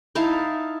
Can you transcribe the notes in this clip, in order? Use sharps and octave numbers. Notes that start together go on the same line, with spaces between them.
D#4 E4 F5 A5